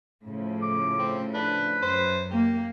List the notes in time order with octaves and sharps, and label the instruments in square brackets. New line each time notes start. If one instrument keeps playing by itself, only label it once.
[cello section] A2 C#3 F3
[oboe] D6
[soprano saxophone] C4
[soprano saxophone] D4 [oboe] B4
[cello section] F#2 [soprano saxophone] C5
[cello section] A#3 [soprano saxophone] G4